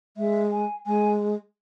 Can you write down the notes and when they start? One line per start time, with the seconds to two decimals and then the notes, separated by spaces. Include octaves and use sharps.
0.17 G#3 E5
0.52 G#5
0.86 G#3 G#5